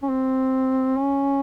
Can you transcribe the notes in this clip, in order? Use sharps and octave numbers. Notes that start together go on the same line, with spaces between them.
C#4
C4
C#4